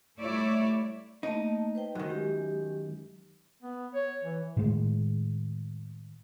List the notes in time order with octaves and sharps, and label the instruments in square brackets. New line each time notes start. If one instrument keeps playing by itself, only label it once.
[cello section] G3 A3 E4 C#5 D5 E5
[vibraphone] A3 A#3 A5 [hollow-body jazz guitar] D#4
[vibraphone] B4 C5 G5
[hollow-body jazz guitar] F#2 D#3 [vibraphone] F#4
[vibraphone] G#3 G4
[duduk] B3
C#5
E3
[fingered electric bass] A2 D#3 G#3